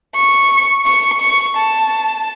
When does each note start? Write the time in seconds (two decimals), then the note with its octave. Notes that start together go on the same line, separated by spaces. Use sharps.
0.16 C#6
0.86 C#6
1.21 C#6
1.57 A5